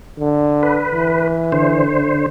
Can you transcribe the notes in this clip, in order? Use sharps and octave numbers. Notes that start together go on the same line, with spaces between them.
D3
B4
E3
D3 C5